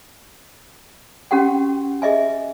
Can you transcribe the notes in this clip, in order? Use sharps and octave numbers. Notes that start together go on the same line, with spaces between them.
C#4 F#4 G4 F#5 G5
G#4 D#5 E5 G#5